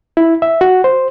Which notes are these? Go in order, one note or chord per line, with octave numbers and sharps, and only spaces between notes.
E4
E5
F#4
C5